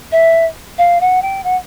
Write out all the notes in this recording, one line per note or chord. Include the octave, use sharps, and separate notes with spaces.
E5
F5
F#5
G5
F#5